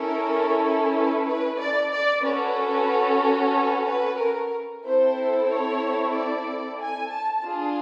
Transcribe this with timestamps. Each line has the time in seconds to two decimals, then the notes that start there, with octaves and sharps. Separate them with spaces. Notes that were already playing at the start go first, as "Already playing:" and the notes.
Already playing: C#4 E4 A4 A#4
0.95 B4
1.27 B4
1.60 D5
1.92 D5
2.24 C#4 F#4 A4 B4
3.54 B4
3.87 B4
4.19 A#4
4.85 C4 E4 A4 C5
5.50 C#5
6.15 D5
6.80 G#5
7.12 A5
7.45 D4 F4 G#4